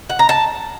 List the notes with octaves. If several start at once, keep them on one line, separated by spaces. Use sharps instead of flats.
F#5
A#5
A5